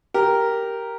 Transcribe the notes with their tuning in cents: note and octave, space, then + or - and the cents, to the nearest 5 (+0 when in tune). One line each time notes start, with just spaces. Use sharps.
G4 +0 A#4 +0